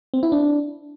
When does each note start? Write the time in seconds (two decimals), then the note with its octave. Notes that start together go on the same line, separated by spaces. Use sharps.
0.14 C4
0.23 E4
0.32 D4